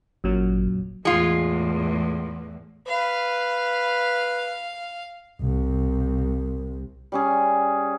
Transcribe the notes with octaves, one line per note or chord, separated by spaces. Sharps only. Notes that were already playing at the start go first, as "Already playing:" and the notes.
G#1 F#2 A#2 F#3
E2 A2 G#3 F4
B4 F5
C2 C3
G3 C#4 G#4